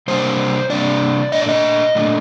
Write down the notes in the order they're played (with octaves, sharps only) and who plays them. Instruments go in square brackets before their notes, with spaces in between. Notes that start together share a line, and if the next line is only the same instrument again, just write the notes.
[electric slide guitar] C3 G3 A#3 D4 C5
C3 G3 A#3 D4 D5
A#2 A3 D4 D#5
D5
D#5
A#2 A3 D4